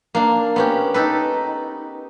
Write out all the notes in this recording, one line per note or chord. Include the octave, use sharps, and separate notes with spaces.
A#3 D4
B3 C#4 G4
D#4 G4 A4 B4